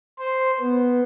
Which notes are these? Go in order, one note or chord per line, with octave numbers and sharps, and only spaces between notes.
C5
B3